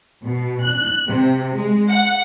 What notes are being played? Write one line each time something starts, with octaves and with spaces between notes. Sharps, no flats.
B2
F#6
C3
G#3
F#5